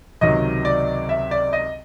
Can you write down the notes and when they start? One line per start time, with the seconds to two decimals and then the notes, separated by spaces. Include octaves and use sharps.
0.21 C#2 C3 D#3 F#3 D#5
0.65 D5
1.09 E5
1.31 D5
1.53 D#5